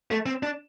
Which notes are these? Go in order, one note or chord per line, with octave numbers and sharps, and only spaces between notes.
A3
C4
D4